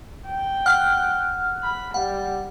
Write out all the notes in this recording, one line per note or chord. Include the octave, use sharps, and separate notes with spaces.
G5
F#5 F6 F#6
B5
G3 F#5